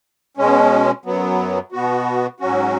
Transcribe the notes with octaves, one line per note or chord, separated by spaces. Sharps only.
B2 G#3 C#4
F#2 F#3 B3
B2 B3 F#4
G#2 F#3 C#4 F#4